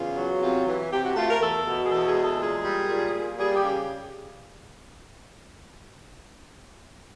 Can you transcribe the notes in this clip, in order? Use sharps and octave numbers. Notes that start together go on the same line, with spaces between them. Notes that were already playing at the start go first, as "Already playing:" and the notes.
Already playing: E2 C#3 F4
F#3
C3 F4
E3
C3 G4
F#4
A3 F4
A#4
E2 A4
B2
G#4
E2 A4
G#4
G#3
A4
A#2 G#4
G3
A#2
A#3
G3 G#4
G4
C#3